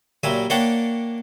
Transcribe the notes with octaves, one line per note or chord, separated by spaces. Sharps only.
A#2 F#3 G3 E5 G#5
A#3 D4 C#5 F#5 G5 A5